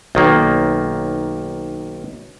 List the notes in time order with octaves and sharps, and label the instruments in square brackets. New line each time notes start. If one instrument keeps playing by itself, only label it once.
[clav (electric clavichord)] B1 D#3 A#3